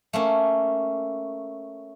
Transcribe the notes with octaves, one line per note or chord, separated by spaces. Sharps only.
A3 A#3 C#4